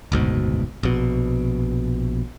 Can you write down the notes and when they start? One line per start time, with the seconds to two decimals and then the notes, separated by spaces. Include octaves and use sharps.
0.12 F#1 D2 G#2 B2
0.83 A#1 B2